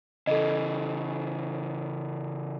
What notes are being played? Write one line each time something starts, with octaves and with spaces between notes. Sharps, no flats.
C#3 E3 A4 D#5